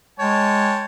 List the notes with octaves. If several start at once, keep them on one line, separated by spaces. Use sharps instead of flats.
G#3 C#5 G5 A5